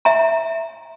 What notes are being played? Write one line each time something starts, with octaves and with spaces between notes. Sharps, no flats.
E5 G#5 A#5